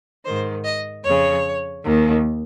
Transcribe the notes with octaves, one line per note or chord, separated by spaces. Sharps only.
G#2 D#3 C5
D#5
F2 C#3 C#5
D#2 D#3